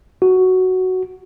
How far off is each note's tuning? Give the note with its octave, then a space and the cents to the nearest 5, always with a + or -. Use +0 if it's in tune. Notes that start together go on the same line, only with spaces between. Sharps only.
F#4 +5